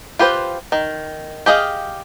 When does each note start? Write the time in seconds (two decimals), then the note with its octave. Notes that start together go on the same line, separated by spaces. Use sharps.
0.19 F4 G4 B4 C5
0.72 D#3
1.46 G4 G#4 D#5 F5